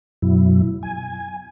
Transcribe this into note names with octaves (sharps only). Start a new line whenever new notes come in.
F#2 B2 F#3 E4
G#5